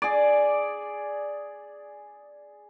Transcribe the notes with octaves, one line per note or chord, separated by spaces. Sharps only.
G#4 D5